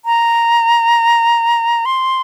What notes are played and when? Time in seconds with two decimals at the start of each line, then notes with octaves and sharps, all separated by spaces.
0.05 A#5
1.85 C6